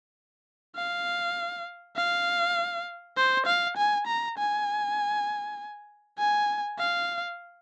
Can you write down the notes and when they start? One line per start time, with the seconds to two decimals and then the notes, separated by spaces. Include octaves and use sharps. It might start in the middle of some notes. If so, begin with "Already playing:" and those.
0.76 F5
1.96 F5
3.17 C5
3.46 F5
3.77 G#5
4.07 A#5
4.38 G#5
6.19 G#5
6.79 F5